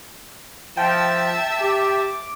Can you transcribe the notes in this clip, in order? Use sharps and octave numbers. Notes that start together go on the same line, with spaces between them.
F3 E5 G5 A5 E6
G4 D6